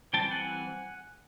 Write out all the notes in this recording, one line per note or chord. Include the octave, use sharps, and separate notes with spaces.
E3 G3 C4 G5 A5
F#5 G#5